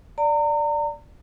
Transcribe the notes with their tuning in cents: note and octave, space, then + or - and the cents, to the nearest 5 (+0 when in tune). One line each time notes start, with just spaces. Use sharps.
D5 +0 A#5 -35